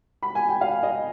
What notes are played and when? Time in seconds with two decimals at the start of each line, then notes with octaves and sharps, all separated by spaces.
0.23 B5
0.35 G#5
0.49 G5
0.61 F5
0.83 D#5